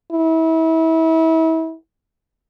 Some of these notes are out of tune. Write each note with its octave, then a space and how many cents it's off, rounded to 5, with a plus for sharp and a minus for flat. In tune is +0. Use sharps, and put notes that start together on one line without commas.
E4 -30